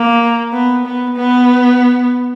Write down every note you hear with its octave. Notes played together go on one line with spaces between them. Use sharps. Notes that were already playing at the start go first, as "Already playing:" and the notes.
Already playing: A#3
B3
B3
B3